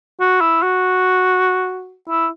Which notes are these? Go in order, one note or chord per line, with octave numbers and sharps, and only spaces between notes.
F#4
E4
F#4
E4